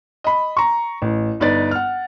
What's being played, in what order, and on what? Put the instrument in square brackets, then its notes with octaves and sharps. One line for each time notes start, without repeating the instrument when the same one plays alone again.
[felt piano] D#5 B5
A#5 C#6
A1
G1 D#4 B4 D5 A6
F#5 F6